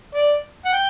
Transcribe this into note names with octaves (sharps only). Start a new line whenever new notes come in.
D5
F#5
G5